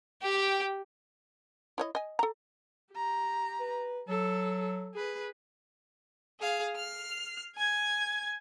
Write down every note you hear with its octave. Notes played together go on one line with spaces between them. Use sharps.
G4 G5
E4 C#5 D#5
D#5 G#5
A4 A#5
G4 A#5
B4
F#3 A4
G#4 B4
G#4 F5
F6 C7
G#5 G#6